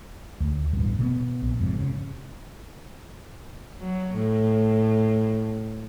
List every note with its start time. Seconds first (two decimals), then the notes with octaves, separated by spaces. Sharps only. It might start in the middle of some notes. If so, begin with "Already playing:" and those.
0.40 D2
0.73 E1 A1 G2
0.99 B2 A3 B3
1.42 A#1
1.60 F2 G#2 C3
1.79 C#3
3.79 F#3
4.15 A2